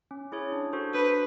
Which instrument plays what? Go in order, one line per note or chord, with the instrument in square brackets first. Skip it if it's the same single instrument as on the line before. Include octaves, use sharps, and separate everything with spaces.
[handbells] C#4
E4 G#4 C#5
D4
F#4 A4 C5
[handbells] D4 [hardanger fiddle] B4